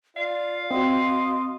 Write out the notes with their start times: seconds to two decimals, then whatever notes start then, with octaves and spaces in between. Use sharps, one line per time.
0.17 F4 D5 F5
0.71 C4 F#4 D#5 C6